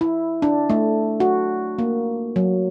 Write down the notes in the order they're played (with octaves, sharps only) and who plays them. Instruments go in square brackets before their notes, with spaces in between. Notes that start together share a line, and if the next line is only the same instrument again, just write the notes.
[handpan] E4
D4
A3
F#4
A#3
F#3